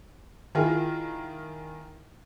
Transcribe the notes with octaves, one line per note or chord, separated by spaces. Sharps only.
D#3 E4 F4 G#4 A#4